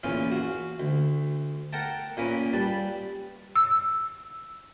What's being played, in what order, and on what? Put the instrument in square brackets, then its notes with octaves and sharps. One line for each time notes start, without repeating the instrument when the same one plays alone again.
[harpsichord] E2 A#2 C#4 F4 F5
F#4 F5
D2
A#4 F#5 G5 A5
A#2 A#3 C#4 B4
G3 B4 A5
[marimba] E6